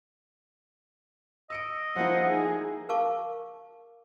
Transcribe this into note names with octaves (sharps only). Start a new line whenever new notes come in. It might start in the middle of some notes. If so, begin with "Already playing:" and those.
D#5 E6 C#7 D7
F3 A#3 E4 C5 F#5
D#4 G#4
A#4 F5 A5 C#6 D6